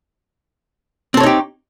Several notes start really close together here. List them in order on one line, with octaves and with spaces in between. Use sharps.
C4 A4 C#5 D#4 G4